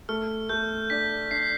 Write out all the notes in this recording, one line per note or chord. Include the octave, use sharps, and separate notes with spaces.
A3 F6
A3 G6
D4 B6
D4 C7